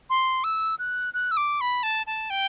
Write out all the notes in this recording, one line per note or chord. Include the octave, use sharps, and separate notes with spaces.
C6
E6
F#6
F#6
E6
D6
B5
A5
A5
G5